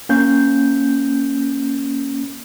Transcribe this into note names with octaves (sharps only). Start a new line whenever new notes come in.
A#3 C#4 G6